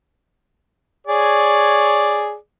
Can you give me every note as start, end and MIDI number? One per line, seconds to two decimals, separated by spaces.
1.07 2.35 68
1.07 2.35 73
1.07 2.35 74